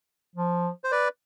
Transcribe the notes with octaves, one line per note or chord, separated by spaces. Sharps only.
F3
C5
B4 D5